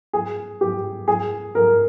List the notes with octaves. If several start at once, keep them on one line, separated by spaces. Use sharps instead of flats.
G#4
G4
G#4
A#4